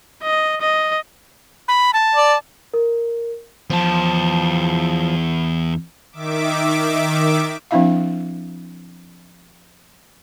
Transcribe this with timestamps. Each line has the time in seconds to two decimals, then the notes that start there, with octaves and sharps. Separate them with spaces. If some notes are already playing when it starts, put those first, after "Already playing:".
0.23 D#5
0.61 D#5
1.68 B5
1.93 A5
2.15 D5
2.74 A#4
3.70 E2 F3 A5
6.12 D#3 E5 D6
7.71 F3 C4 D4 E4 E5 F5